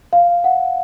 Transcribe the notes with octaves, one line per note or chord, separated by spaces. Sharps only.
F5
F#5